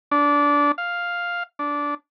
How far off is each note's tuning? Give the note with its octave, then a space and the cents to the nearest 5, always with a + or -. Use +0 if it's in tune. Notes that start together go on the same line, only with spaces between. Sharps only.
D4 -20
F5 +0
D4 -15